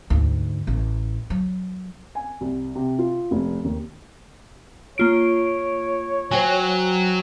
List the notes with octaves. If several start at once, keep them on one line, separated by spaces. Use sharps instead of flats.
D2 G#2
A1
F#3
G#5
C2
C3
F4
F1
D#2
A#3 F4 C#5 D7
F#3 C5 G5 G#5